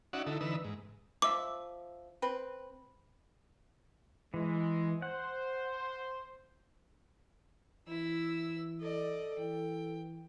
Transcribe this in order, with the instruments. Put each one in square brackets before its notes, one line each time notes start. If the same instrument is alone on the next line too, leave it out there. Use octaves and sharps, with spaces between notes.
[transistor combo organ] C#4 D#4 F#4 D5 E5 F#5
D3 D#4 E4 A4
D3 E3 D#4 B4 E6
G#2
[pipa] F3 E5 [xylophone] D6
[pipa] C4 B4
[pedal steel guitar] E3 [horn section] G#3
[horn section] C5 [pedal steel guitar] F#5
[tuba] E3 [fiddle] E4 E6
[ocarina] A4 [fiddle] D5 D#5
[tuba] E3 [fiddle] G5